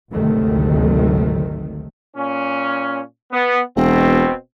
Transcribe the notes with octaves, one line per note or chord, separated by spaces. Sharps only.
G#1 D2 C3 D#3 F#3 A3
A#2 C#4
B3
E1 B2 C4